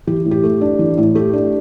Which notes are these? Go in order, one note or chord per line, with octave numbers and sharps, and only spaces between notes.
E3 G4
A2
G4
A3
D4
E3
A2
A3 G4
D4